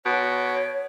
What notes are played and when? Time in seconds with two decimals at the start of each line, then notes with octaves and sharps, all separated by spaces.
0.06 B2 C#5